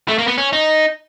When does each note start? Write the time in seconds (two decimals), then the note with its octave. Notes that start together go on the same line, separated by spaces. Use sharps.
0.08 A3
0.18 A#3
0.28 B3
0.38 C#4
0.53 D#4